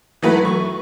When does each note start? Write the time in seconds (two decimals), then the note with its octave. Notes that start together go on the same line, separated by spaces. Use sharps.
0.22 E3 F#3 A3 B4
0.45 C#6